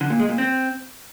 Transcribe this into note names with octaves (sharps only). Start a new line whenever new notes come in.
D3
A#2
G#3
A#2
C4